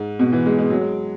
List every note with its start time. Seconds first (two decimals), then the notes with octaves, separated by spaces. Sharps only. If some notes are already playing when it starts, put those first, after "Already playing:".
Already playing: G#2
0.19 B2
0.33 E3
0.46 G#3
0.58 G#3
0.70 F#3
0.81 G#3